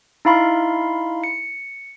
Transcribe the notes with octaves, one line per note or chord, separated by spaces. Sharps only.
D#4 E4 F5 B5 C6
C#7